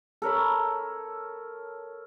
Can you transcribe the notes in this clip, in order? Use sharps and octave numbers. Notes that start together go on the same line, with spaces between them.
A4 A#4 C#5 B5